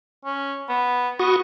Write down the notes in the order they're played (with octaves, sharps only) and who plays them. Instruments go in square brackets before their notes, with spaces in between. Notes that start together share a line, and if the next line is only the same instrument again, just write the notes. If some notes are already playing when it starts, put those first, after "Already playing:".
[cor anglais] C#4
B3
[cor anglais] B3 [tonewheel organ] F#4 C#6 D#6